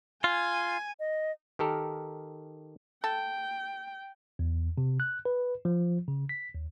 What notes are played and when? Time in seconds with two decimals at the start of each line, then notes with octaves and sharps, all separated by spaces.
0.24 F4 G#5
1.00 D#5
1.59 D#3 G4 A4 A#4
3.04 A4 G5
4.39 E2
4.78 C3
5.00 F#6
5.25 B4
5.65 F3
6.08 C#3
6.29 B6
6.55 D#2